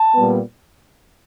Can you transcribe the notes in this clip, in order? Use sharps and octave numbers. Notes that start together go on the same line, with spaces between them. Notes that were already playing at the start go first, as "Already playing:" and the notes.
Already playing: A5
A#2 G3 B3